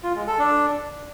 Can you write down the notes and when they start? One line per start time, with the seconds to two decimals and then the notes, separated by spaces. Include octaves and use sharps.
0.03 F4
0.15 G#3
0.27 A4
0.39 D4